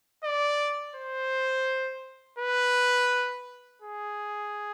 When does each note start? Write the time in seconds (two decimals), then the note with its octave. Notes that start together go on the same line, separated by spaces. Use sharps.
0.24 D5
0.95 C5
2.38 B4
3.82 G#4